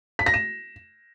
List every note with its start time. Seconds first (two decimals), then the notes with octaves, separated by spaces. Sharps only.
0.19 B6
0.26 A#6
0.34 E7